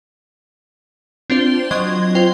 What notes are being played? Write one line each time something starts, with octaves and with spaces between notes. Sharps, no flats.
C4 D4 F4 C5 G7
F#3 D#5 C6 G#6
F4 C5 G5